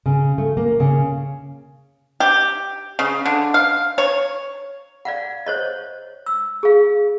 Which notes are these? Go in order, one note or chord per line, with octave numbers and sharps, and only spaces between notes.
C#3
A3
A#3
C#3
G4
C#3
D3
F5
C#5
D5 F5 F#5
C5 C#5 D#5
E6
G#4 F5